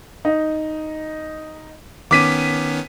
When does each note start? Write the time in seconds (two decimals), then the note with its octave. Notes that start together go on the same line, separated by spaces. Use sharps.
0.25 D#4
2.11 D#3 B3 C#4 D6 B6 D#7